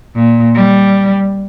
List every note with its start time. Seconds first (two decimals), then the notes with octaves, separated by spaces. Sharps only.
0.15 A#2
0.55 G3